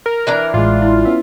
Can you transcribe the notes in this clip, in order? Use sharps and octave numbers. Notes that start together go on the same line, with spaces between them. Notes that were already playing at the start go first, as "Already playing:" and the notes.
A#4
E3 D4 A#5
A1 G#3 F4
E4
B3 C#4 E5